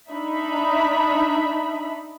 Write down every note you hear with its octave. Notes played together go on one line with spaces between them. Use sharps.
D4 D#4 E5 B5